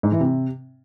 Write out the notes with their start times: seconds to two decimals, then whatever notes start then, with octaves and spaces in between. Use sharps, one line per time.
0.03 G#2
0.12 E3
0.21 C3